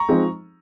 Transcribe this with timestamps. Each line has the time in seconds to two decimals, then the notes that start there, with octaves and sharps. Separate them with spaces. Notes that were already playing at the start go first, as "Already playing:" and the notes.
Already playing: A#5 C#6
0.09 F3 G#3 C4 D#4